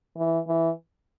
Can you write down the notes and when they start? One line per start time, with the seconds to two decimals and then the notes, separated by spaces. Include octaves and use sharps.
0.17 E3
0.48 E3